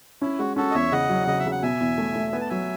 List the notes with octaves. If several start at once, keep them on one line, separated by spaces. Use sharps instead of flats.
C#4 E4
G#3 F#4
C#4 F#4 A4
D#5
E2 C#5 E5
C#3 D#5 F#5
F#3
C#3 D#5
E5
C#3
F#5
B2 E5 G#5
E2
A3
A3
B3 G#5
A5
F#3 E5 G#5